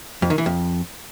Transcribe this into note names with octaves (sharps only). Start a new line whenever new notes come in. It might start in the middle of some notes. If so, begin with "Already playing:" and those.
F2
D#3
E3
F2